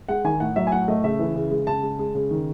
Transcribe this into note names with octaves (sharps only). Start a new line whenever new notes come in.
G#3 F#5
D#3 G#5
A2 F#5
F#3 E5
G#5
A2 F#5
A3 D#5
C#3 E5
E3
C#3
G#3
C#3 A5
G#3
G#3
C#3
D#3